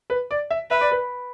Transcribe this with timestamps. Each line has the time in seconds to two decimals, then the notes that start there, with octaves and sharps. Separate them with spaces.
0.10 B4
0.31 D5
0.50 E5
0.71 B4 E5
0.81 D5
0.91 B4